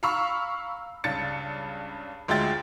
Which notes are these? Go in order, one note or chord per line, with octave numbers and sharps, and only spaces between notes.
F5 A#5 B5 C#6 E6 F6
C#2 G2 A6 C#7
D2 G#3 F4 E5 G5 A6